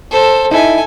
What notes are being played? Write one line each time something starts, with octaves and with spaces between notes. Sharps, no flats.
A4 C5
D#4 E4 A4 G#5